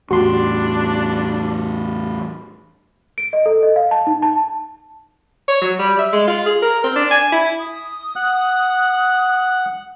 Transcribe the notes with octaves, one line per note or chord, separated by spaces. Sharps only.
E2 A2 D4 F#4 G4 C6
D7
D#5
A4
D#5
F5
A5
D#4
A5
C#5
F#3
G3
E5
G#3
F4
G#4
A#4
C4
D4
G#5
E4
D#6
F#5 F#6